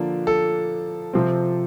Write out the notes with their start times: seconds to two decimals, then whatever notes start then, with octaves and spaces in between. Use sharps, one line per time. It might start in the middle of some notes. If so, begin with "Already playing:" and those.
Already playing: D3 F3 A#3 D4 A4
0.27 A4
1.13 C3 F3 C4